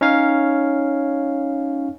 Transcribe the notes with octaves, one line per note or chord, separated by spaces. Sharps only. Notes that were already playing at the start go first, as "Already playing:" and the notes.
C#4 D#4 C#5 F5